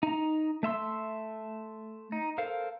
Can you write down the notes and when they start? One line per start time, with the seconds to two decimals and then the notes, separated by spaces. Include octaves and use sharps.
0.03 D#4 A#5
0.63 A3 E5 C6 E6
2.12 D#4
2.38 A4 A#4 C5 F5